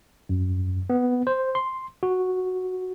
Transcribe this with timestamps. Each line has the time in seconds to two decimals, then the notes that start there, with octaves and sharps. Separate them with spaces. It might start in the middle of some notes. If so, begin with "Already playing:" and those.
0.29 F#2
0.90 B3
1.27 C5
1.55 C6
2.03 F#4